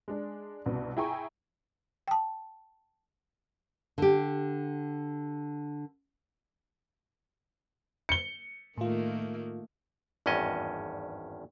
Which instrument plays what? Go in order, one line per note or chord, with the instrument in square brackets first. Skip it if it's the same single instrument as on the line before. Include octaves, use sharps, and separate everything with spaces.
[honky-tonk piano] G#3 D4
C2 G2 B2
E4 G#4 G5 G#5 A#5 C#6
[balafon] G5 A5
[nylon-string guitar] D3 G4
[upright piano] C#7 G7
[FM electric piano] A2 F4 [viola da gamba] D#3 A3 A#3
[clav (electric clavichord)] G#1 E2 G2 C#4 D#5